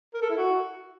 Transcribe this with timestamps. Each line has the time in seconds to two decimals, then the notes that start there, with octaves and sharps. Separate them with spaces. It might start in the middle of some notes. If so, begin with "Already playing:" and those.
0.14 A#4
0.22 A4
0.30 E4
0.38 F#4